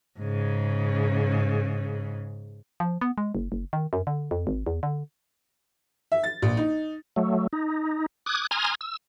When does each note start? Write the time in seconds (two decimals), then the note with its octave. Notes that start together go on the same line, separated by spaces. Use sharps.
0.19 G#2 C#3
2.80 F3
3.01 B3
3.18 G#3
3.35 F#1
3.52 F#1
3.73 D#3
3.93 F#2
4.07 D3
4.31 F2
4.47 G#1
4.67 E2
4.83 D3
6.12 E5
6.24 A6
6.42 A#1
6.57 D#4
7.16 F#3 A3
7.53 D#4
8.26 D6 D#6 F#6 G#6
8.51 G#5 A#5 C6 D#6 F6 G#6
8.81 E6